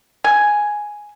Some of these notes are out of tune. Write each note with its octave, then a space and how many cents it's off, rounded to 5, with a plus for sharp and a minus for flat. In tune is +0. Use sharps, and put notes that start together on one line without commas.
G#5 +5